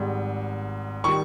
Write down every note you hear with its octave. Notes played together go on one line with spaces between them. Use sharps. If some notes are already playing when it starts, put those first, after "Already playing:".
Already playing: G#1 G#2 G3
D#3 G3 C#6